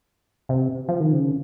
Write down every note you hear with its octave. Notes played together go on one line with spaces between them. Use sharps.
C3
F3
D#3
C#3